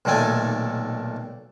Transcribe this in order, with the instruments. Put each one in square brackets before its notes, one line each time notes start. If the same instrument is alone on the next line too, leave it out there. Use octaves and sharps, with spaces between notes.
[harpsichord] B1 A#2 D#3 A3 G#5